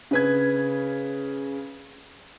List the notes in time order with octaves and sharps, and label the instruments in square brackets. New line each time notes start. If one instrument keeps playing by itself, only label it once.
[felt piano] C#3 B4 G#6